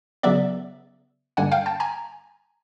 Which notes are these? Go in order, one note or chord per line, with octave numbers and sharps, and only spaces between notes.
C#3 F#3 B3 D5 E5
G2 D3 G3 A#3 F#5 G#5
F5 G5
G5 A5
G#5 A#5